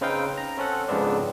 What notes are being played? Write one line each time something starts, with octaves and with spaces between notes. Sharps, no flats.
C#3 C4 D#4 B4 F5 G5
A#5
C4 C#4 A4 F#5
F2 G#2 C#3 B3 C4 D4